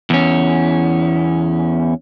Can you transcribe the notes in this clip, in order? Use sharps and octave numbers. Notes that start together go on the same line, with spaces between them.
E2 C#4